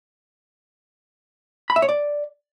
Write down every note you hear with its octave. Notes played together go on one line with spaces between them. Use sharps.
B5
E5
C#5
D5